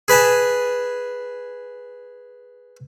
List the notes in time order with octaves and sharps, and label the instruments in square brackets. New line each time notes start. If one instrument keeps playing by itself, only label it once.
[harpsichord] G#4 B4 G#5 A5